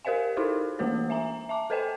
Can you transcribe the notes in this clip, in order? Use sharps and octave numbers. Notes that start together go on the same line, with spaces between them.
G4 A#4 C5 D#5 F5 G#5
D#4 E4 F#4 A4 A#4 C5
E3 A3 A#3 F#4 B4 C#5
E5 G#5 A#5
E5 A5 D6
A4 B4 C5 D#5 G5 G#5